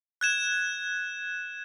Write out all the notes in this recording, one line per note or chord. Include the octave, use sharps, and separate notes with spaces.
F#6 G#6 E7